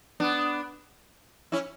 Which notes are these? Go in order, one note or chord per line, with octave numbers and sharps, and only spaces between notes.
B3 D4
C#4 E4